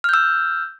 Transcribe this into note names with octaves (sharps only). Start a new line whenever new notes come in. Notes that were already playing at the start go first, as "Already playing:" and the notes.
E6 F6 G6